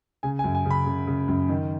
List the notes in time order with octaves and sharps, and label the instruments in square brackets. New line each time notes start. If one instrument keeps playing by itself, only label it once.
[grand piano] C#3 G#5
G#5
F#2
G#5
C#3
B5
C#3
C#3
F#2
D#3